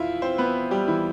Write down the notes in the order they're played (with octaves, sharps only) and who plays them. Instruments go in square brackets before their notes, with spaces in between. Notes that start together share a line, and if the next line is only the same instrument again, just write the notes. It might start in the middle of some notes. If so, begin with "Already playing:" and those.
Already playing: [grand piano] E2 E4 F4 E5
C4 C5
B3 B4
G3 G4
E3 E4